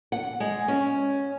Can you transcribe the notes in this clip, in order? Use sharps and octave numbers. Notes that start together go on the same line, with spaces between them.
F#5
G#3
C#4